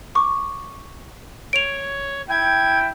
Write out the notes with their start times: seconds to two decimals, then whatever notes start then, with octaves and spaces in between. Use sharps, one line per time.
0.15 C#6 D6
1.53 C#5 D7 F7
2.29 E4 G5 G#6